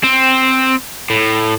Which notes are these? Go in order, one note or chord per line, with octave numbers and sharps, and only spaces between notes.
C4
A2